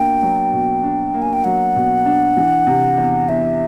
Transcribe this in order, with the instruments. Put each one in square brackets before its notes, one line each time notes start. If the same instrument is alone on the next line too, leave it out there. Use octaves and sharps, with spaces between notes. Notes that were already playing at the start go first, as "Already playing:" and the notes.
Already playing: [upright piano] B2 A#3 D4 [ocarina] G5
[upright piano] F#3
B2
D4
A#3
[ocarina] G#5
G5
[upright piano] F#3 [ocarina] F#5
[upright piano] B2
D4
E3
C3
E2
[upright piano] E2 [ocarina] E5